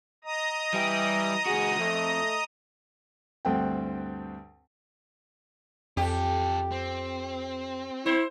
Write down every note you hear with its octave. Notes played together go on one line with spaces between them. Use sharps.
D#5 A#5 D#6
E3 G3 G4
C#2 F#4 G#4
F2 A3
D2 G2 C4 A4 F#5 G5
F2 C#4 G4 A4
C4
E4 C5